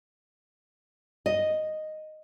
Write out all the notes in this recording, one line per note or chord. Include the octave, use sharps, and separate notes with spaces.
D#5